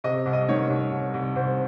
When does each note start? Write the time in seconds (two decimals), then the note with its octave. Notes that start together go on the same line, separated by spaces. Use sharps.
0.04 C3 D#5
0.26 C2
0.33 D#5
0.49 D#3 C#5
0.69 C2
0.91 C2
1.14 C2
1.36 C2 C5